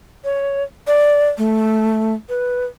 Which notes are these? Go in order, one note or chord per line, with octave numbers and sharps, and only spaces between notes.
C#5
D5
A3
B4